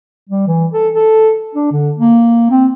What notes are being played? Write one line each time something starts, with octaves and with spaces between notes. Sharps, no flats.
G3
E3
A4
A4
D4
D3
A#3
C4